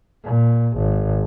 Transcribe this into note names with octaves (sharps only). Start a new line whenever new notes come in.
A#2
G#1